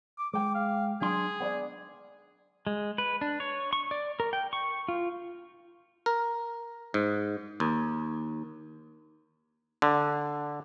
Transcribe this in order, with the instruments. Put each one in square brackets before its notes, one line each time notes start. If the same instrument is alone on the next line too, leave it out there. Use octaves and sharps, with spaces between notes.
[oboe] D6
[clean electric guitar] G#3 G5 [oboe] D6
[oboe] F5
[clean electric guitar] F#3 D4 C6 [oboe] G#4
[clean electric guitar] B3 C#5 D5
[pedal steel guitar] G#3
B4
D4
C#5
C#6
D5
A#4
G5
C#6
F4
[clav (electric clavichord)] A#4
G#2
D#2
D3